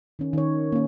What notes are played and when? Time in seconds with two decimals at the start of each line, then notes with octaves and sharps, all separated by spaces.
0.19 D#3 C#4
0.33 D#3 C#5
0.72 A#3 C#4